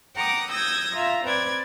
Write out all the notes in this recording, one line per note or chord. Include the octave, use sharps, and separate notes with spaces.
F#5 G5 A#5 D6 D#6
D#6 E6 G6 G#6 A#6
F4 E5 A#5
C4 B4 D5 G#6 A6